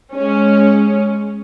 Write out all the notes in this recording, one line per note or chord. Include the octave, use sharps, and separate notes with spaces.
G#3 C#4